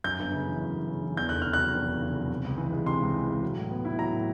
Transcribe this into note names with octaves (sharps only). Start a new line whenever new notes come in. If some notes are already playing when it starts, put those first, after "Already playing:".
F#2 G6
G1
C#3
E3
F#2
G1
C#3
E3
E2 G6
F1 F#6
C#3 F6
F#6
F#3
E2
F1
C#3
F#3
C3
C#2
E3
G#3
C3 C6
C#2
E3
G#3
F#3
A2
B3
E4
F#3 A#5
A2